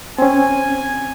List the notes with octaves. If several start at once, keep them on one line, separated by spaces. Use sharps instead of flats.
C4 C#4 G#5